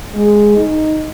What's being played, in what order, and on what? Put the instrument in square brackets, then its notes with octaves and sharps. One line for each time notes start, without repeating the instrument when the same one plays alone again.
[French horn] G#3
D#4